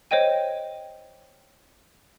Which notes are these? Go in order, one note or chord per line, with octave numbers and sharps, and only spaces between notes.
C5 C#5 D#5 G5 D#7